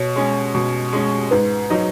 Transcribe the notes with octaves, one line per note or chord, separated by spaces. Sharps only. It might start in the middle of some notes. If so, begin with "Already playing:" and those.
Already playing: B2 C#5
G#3 C#4
B2
G#3 C#4
G#2 B4
F#3 D#4